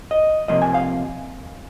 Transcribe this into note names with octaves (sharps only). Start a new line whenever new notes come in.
D#5
C3 F3 A#3 D#5
G#5
F5